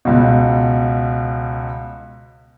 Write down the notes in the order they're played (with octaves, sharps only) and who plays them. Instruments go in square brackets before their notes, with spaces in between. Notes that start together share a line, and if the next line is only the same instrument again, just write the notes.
[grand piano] C#2 B2